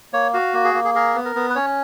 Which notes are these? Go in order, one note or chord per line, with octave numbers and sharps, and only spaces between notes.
A#3 C#5
F#4 F5
A#3
G#4
A#3
G#4
G#4 A#4
B3
A#4
B3
B4
C#4 C#5